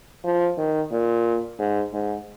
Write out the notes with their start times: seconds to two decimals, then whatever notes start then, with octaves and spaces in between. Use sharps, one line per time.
0.25 F3
0.58 D#3
0.92 A#2
1.59 G#2
1.93 G#2